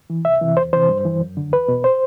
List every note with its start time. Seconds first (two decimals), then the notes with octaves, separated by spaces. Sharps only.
0.10 E3
0.25 C2 E5
0.41 C3 E3
0.57 E2 C5
0.73 C3 E3 C5
0.89 G2
1.05 E3
1.21 F#2
1.37 D3
1.52 E2 B4
1.68 B2
1.84 C5